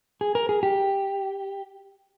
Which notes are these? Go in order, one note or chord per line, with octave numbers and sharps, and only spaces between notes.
G#4
A#4
G#4
G4